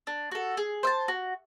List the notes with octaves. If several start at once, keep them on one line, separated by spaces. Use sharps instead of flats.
D4
F#4 A4
G#4
C5 E5 A5
F#4